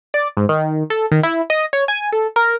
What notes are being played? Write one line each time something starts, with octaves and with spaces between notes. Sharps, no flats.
D5
G#2
D#3
A4
D#3
E4
D#5
C#5
G#5
A4
A#4